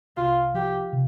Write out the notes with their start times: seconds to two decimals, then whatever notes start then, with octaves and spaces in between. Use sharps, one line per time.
0.17 C2 F4
0.54 F3 G4
0.93 C3